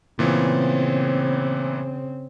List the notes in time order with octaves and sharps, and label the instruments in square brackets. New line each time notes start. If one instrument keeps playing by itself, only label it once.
[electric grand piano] A#2 E3 B3 [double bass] C#3 C4